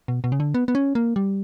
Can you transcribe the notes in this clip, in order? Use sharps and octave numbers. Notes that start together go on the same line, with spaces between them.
B2
B2
C#3
D3
B3
B3
C#4
A#3
G3